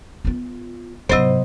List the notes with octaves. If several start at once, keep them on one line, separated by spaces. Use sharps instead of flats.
B3 F4
G#2 C3 F#3 B3 E4 C5 D#5